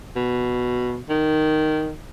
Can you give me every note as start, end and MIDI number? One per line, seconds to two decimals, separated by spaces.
0.16 1.00 47
1.09 1.95 51